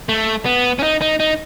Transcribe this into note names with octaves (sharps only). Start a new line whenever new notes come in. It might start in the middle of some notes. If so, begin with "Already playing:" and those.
A3
B3
C#4
D#4
D#4
D#4